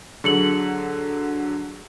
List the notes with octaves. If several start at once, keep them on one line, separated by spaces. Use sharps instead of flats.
D3 F#3 G#4 C#7 F#7